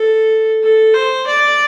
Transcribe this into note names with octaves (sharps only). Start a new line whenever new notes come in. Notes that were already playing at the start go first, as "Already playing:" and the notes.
Already playing: A4
A4
C5
D5